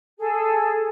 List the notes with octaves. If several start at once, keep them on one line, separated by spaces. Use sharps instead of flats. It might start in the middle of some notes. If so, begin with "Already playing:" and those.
G#4 A4